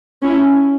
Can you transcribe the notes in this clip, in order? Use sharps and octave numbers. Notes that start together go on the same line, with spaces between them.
C#4 E4